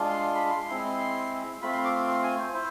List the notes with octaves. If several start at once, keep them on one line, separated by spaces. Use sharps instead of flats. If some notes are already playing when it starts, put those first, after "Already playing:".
Already playing: G#3 D4 F4
C6
C6
B5
C6
C6
G#3 C4 E4
A3 C4 F4 B5
C6
D6
C6
G#5
C5
E4 C5